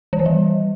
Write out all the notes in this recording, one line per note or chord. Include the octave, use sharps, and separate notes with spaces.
E3
D#3
G3